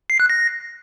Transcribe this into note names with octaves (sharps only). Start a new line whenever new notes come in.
C7
F#6
A#6